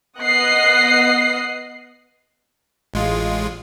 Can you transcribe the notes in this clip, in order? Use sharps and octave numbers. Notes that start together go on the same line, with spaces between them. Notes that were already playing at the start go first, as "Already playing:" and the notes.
B3 D#5 F#5 D#6 F#6 C7
A1 G#3 F4